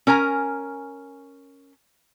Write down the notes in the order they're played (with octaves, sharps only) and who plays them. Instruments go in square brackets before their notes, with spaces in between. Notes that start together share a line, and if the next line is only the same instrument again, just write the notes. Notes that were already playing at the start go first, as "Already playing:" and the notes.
[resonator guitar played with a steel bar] C#4 A#4 G#5 A#5